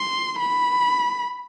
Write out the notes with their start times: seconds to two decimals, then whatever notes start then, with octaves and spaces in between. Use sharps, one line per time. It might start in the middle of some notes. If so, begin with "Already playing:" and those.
Already playing: C6
0.40 B5